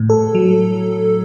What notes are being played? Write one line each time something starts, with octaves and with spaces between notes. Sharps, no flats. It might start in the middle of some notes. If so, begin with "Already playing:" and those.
Already playing: A2
A4
F#3